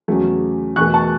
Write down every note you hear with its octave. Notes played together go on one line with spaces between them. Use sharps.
E2 C#3 F#3 A3
E2 B2 A3 C#6 F#6
A5 C#6